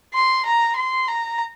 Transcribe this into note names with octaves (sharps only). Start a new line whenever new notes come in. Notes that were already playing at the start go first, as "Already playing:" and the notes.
C6
A#5
C6
A#5